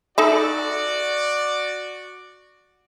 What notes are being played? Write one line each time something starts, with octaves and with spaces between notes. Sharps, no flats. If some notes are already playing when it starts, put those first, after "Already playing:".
D#4 F#4 A4 D5 E5